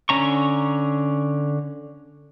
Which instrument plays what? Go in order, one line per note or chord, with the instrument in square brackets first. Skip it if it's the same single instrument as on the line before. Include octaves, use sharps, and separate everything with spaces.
[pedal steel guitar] D3 C#4 A#5 C#6